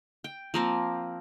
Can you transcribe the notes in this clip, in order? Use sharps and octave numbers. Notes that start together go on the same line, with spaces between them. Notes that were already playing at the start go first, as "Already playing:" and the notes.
G5
F3 A#3 C4